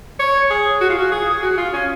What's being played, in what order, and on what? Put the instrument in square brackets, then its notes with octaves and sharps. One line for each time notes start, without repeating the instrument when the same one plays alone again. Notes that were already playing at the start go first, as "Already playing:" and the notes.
[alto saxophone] C#5
G#4
F#4
F4
F#4
G#4
G#4
F#4
F4
C#4